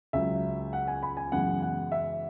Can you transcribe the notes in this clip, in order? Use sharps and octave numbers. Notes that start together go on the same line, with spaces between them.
C#2 C#3 F#3 E5
F#5
G#5
B5
G#5
F#2 C#3 E3 G#3 B3 F#5
F#5
E5